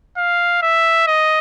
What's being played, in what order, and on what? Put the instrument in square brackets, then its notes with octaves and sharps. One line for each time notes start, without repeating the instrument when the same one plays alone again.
[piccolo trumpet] F5
E5
D#5